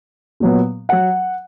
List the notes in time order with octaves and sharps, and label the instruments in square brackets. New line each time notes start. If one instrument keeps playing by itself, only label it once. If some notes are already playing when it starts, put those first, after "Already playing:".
[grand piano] A#2 F#3 B3
F#3 F#5